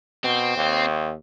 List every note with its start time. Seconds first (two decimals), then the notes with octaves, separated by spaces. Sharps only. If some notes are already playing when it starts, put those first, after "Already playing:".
0.24 B2 C4
0.56 D#2